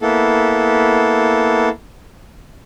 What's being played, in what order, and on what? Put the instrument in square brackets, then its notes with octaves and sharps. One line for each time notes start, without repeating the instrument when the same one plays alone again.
[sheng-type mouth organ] A#3 B3 E4 A4